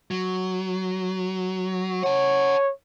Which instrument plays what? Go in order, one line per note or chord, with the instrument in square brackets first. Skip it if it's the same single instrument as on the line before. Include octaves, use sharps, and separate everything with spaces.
[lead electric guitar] F#3
[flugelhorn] C#5 [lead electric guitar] F#5 A5